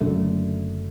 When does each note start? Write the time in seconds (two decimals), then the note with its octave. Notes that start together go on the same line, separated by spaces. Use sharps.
0.01 F#1 F#2 D3 A3